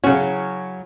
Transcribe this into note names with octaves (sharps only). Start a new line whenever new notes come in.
C#3 F#3 C#4 F#4